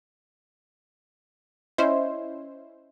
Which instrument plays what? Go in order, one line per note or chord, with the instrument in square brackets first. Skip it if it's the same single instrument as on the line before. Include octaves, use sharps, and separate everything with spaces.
[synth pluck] C#4 E4 C5 [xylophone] D#5 E5 C6